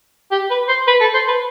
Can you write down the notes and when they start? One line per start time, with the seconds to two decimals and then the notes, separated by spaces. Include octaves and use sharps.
0.31 G4
0.50 B4
0.68 C5
0.87 B4
1.01 A4
1.14 C5
1.28 B4